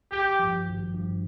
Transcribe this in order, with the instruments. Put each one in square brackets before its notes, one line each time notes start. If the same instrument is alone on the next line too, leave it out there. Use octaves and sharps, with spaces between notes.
[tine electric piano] G#1 [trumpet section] G4
[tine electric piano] G2 F3
G#1
G2 F3